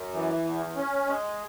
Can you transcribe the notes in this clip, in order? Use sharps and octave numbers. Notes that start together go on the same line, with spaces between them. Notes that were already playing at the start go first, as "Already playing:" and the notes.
Already playing: F#2
E3
E2
C#4
G#3